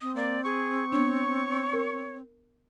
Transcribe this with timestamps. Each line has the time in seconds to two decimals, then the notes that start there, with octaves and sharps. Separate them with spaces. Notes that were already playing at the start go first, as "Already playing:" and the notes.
0.01 C4 D#6
0.16 A#3 D5
0.45 G#4 C#6
0.92 B3 D4 C#5
1.73 A#4